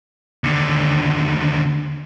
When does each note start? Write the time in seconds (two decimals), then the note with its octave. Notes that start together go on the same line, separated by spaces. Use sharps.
0.44 D#2 D3